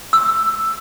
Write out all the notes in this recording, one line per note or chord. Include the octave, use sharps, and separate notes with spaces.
E6